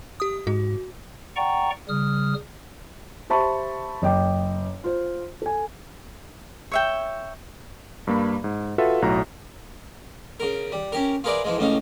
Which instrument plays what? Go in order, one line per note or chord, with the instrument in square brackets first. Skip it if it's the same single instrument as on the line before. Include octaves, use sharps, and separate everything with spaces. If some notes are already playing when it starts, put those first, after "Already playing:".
[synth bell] G4 D#6
[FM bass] G#2 [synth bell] F#4
[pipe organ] D5 F#5 G5 A#5 C#6
C#3 G3 D#6 F6
[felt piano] G4 C5 E5 A5 B5 C#6
F#1 D#5 G5 D6
F4 C5
A4 G#5
[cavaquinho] C#5 E5 G5
[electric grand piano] G2 A#3 B5
G#2
F4 F#4 A4 B4 E5 F#5
B1 A2 F#4 A#5
[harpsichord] C#3 A#4
G3
C#4 G4 A#4
F4 G#4 A#4 B4 D5 E5
E3 F3 G#3
C#2 A2 C#4 D#4 F5